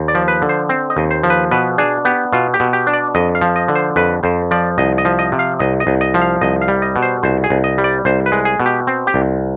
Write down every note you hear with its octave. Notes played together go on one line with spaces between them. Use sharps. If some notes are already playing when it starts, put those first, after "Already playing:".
Already playing: D#2
D5
F3
B4
D3
C5
C4
D#5
D#2
C5
F3
B4
B2 B4
D4 G#4
B3 G4
B2 F4
G4
B2
G4
D4
D5
F2 D#5
F5
F3
D#5
D3
C5
F2 B4
F2 C5
F3 D5
C2 D#5
D#5
F3
D#5
C3
F5
C2 D#5
D#5
C2
D#5
F3
F5
C2 D#5
F5
G3
D#5
B2
C5
C2 C5
G#4
C2
D#5
G3
D5
C2 C5
B4
G#3
G#4
B2
G4
C4
G4
C2